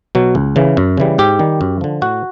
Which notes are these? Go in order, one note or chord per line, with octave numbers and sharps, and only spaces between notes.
B2 F#3
C#2
C#3 E3
F#2
C#3 E3 G3
G#2 G4
D#3 G3
F#2
D3 F3
A2 F#4